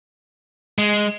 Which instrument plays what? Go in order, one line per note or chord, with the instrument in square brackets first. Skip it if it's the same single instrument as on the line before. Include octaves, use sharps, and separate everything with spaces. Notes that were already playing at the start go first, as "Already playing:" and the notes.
[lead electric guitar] G#3